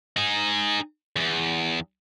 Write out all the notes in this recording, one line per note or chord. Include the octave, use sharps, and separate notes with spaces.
D#4 G#4
E2